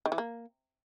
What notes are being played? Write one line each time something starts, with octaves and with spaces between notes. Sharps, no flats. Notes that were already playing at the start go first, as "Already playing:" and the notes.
D#3
E3
A#3